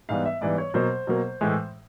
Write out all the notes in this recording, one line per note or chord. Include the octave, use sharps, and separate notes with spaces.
G#2 E3 G3 B3 F5
E5
G#2 E3 G3 B3 D5
C#5
B2 F#3 A#3 C5
B2 F#3 A#3
A2 E3 G#3